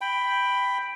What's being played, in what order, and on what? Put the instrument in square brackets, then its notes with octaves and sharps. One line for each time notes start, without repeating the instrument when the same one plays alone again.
[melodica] G5 B5